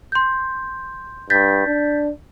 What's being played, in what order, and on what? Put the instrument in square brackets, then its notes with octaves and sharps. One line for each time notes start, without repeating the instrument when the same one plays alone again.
[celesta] C6 G6
[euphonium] G2 [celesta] G6 A6 B6
[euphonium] D4